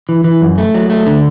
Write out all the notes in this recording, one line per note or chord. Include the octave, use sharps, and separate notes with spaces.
E3
E3
F#2
A3
F#3
A3
D3